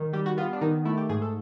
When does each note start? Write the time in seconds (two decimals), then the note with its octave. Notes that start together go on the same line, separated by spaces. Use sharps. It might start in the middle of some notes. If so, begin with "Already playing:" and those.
Already playing: D#3
0.13 G3 G4
0.26 F#4
0.37 B3 F4
0.53 D4
0.61 D#3 D#4
0.85 A3 E4
0.97 G4
1.09 G#2 G#4
1.22 A4